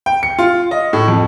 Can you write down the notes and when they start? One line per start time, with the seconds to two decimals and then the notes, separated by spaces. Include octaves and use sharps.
0.06 G5
0.23 C#7
0.39 F4
0.71 D#5
0.93 A2
1.08 F2